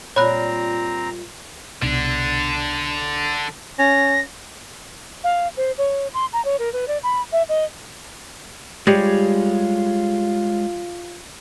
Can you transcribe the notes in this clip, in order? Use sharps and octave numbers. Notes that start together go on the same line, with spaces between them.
A#2 G3 C4 F4 C#5 A#5 B5 F#6
C2 B2 D3 D4
C#4 A#6
F5
C5
C#5
C6
A#5
C#5
A#4
B4
D5
B5
E5
D#5
G3 G#3 F4 G#4 C#5